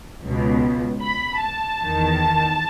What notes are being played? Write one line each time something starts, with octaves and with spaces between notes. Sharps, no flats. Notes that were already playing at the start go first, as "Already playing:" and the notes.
C#2 B2
B5
A5
E2 D#3